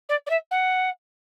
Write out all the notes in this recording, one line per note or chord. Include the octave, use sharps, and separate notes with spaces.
D5
D5
E5
F#5